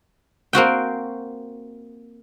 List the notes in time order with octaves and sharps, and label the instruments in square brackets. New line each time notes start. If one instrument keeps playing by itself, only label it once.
[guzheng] A#3 C4 F#4 G5